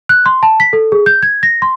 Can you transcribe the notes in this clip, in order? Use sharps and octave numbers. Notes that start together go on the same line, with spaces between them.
F#6
C6
A5
B6
A4
G#4
G6
G#6
A#6
C6